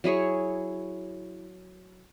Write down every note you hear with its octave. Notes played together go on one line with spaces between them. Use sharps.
F#3 E4 G#4 C#5